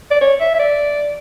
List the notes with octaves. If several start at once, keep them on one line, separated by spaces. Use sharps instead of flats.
D5
C#5
E5
E5
D5